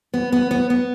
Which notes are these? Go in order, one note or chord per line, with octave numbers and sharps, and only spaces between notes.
B3
B3
B3
B3